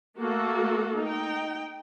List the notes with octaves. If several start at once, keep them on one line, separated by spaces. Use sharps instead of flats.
A3 A#3 F#4 A4
D#4 G5